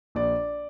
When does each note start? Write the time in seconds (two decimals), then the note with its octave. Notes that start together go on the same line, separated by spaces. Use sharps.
0.15 A#1 D5